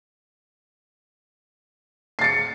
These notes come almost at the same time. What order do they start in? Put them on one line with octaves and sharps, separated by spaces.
C7 A6 C#7